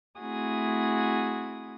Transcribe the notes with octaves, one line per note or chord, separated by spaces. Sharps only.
A3 C4 E4 F#4 G#4 D#6